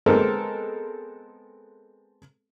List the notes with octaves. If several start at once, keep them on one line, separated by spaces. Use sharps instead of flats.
G#3 B3 C4 A4 A#4